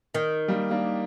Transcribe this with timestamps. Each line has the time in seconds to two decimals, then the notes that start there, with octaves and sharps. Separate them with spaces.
0.14 D#3
0.48 G3 A#3
0.71 A#3 D4